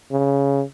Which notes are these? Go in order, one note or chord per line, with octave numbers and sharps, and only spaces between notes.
C#3